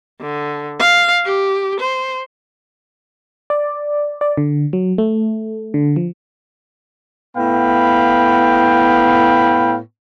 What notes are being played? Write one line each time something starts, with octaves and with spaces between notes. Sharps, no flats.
D3
F5
G4
C5
D5
D5
D3
F#3
A3
D3
F3
A2 B3 F5 G5 B5